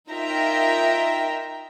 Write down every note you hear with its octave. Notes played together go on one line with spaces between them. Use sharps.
D#4 F4 A#4 E5 G5 A#5